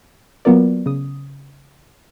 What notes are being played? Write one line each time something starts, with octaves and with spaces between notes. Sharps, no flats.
F#3 A#3 B3 F4 A#4 D5
C#3 D#6